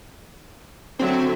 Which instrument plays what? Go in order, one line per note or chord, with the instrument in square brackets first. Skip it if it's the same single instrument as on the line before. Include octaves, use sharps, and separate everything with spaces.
[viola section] D3 F#3 E5 [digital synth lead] C4